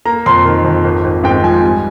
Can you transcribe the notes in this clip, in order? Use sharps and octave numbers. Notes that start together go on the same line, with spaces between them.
A#3 A#5
F2 C6
D#3
F2
G#1
G#1
G#2 G5
F3 G#5
G3